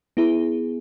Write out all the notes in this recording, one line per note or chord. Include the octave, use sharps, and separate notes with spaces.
B3 E4 G#4